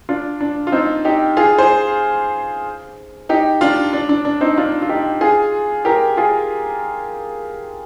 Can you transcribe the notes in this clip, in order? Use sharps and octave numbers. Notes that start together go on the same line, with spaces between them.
D4 F4
D4
F4
C4 D#4
D#4 G4
F4 G#4
G#4 C5
D#4 G4
D4 F4
D4
D4
D4
C4 D#4
D4 F4
F4
D#4 G4
F4 G#4
G4 A#4
F4 G#4